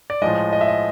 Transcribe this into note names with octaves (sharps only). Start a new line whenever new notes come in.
D5
A2 F3 G#3 D#5
D#5
E5
D#5